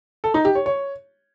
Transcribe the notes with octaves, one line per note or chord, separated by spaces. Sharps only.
A4
D#4
G4
C#5
C#5